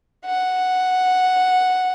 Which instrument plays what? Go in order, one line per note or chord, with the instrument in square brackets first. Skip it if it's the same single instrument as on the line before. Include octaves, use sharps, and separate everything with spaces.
[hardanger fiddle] F#5